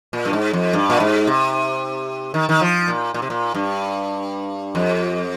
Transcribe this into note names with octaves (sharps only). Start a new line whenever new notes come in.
A#2
G2
G#2
F2
G2
A#2
G#2
C3
D#3
D#3
F3
A#2
A#2
C3
A#2
G2
F2